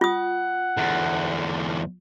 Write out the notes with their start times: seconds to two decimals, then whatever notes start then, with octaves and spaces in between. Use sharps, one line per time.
0.01 F4 F#5 D#6
0.77 E2 D3